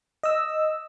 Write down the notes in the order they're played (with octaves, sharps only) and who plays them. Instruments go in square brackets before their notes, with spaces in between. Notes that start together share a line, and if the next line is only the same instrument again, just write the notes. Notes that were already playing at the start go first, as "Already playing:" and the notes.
[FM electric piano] D#5 E6